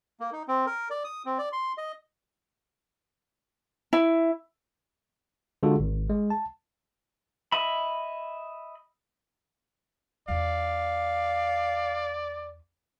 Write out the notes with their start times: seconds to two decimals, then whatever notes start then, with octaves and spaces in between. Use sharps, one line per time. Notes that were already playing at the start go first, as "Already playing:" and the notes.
0.20 A#3
0.32 D#4
0.48 C4
0.66 A#4
0.90 D5
1.04 D#6
1.26 C4
1.38 D5
1.52 C6
1.78 D#5
3.93 E4
5.63 D3 G#3 F4 F#4 A4
5.80 G#1
6.10 G#3
6.30 A5
7.52 D#5 E5 B5
10.28 E2 F4 D5 F5